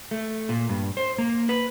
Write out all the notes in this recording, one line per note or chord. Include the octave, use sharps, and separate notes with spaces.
A3
A#2
G2
C5
A#3
B4